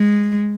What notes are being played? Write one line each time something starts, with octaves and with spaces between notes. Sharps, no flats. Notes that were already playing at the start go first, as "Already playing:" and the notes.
Already playing: G#3